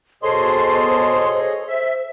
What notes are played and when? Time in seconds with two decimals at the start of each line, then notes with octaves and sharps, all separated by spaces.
0.23 B2 G#4 A4 C5 C#5 D#5 C6
1.68 C5 E5